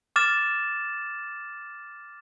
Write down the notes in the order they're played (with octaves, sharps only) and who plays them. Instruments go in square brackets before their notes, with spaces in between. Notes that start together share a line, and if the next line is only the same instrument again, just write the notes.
[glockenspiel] D6 F6 A6 E7